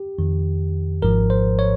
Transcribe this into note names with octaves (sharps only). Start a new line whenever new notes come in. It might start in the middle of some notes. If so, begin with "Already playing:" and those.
Already playing: G4
F2 D#3
G#1 G#2 F3 A#4
C5
C#5